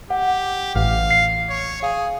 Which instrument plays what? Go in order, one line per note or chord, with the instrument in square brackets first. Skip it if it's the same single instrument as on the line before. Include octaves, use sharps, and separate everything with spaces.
[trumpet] G4 [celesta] F#5
[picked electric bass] A1 [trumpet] F5
[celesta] C7
[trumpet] C#5
[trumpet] G#4 [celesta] F5